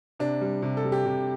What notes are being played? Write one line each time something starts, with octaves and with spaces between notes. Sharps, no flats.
C3 D4
G3
C3
A4
G3
G4
C3